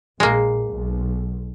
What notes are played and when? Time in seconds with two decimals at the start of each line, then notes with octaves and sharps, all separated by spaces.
0.20 A#1 G#3 A#3
0.70 B1